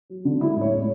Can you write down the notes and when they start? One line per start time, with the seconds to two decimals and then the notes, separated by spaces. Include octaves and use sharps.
0.10 F#3
0.25 D3
0.41 G#3 E4
0.56 A2 C#5
0.72 G#3